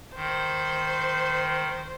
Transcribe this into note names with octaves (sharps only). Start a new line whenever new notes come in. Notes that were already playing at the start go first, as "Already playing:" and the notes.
D#3 C5